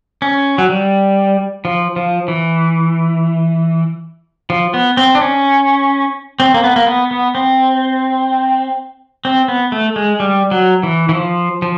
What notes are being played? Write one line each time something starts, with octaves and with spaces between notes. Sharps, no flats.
C#4
F#3
G3
F3
F3
E3
F3
B3
C4
D4
C#4
C4
A#3
B3
A#3
B3
B3
C4
C4
B3
A3
G#3
G3
F#3
E3
E3
F3
F3